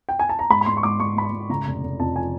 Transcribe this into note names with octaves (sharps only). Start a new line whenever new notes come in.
G5
G#5
A5
A#5
G#2 B5
B5
G#2 C6
C#6
G#2 D6
G#2 C#6
G#2 B5
C6
G#2
C#3 A#5
F1
F1
F2 A5
F3 G#5